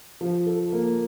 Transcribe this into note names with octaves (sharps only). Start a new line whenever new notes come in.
F3
A4
A#3